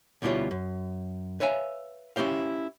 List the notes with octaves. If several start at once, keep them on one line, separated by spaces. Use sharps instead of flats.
D2 B2 G3 E4 F4 C#5
F#2
B4 C#5 E5 F5 G#5
C#4 E4 G4 C5 F5